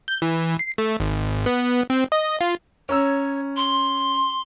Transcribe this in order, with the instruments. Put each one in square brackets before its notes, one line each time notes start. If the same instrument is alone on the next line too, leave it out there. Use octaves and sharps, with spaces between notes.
[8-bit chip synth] G6
E3
C7
A3
G#1
B3
C4
D#5
F4
[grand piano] C#4 A#5 E6 [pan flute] C#5
[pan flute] C6